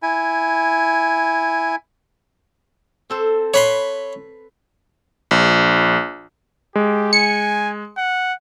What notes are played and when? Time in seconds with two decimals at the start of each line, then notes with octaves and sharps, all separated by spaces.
0.03 E4 G#5
3.10 C4 A4 C5
3.54 B4 C#5 B5 C6
5.31 A#1
6.76 G#3 G4
7.13 G#5 C#7
7.98 F#5